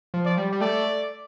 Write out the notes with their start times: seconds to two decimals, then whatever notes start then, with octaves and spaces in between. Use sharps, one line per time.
0.14 F3
0.25 D5
0.37 G3
0.52 G3
0.61 A3 D5